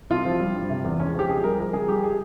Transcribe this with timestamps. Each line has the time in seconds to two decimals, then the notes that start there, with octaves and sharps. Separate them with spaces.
0.10 C2 F4
0.25 F3
0.40 G3
0.55 G2
0.70 C3
0.84 E2
1.00 C#2 C#4
1.14 F3 G4
1.29 C#2 G#4
1.43 G3 A#4
1.58 F3 A#4
1.73 C#2 G#4
1.88 G3 G4
2.04 G#4